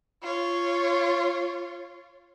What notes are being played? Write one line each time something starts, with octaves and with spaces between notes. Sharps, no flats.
F4 C#5